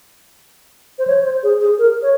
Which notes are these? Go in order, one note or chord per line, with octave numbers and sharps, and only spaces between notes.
C5
C#5
C5
G#4
G#4
A#4
C#5